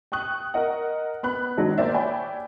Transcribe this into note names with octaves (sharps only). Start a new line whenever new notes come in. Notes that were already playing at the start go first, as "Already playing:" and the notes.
G5 C#6 D#6 F#6
A#4 D#5 F#5
B3 B5 F#6
D#3 F#3 G#3 D4
A#3 C5 D5 E5
C#5 D5 E5 G5 G#5 B5